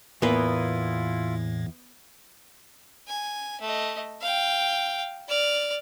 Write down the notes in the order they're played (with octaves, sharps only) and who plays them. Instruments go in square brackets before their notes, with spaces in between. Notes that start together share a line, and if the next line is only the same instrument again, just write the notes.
[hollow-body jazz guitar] E2 A#3 [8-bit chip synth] A2 [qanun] B3 B4 [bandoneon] E4 F4
[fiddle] G#5
A3 D#5
F5 G5
D5 F6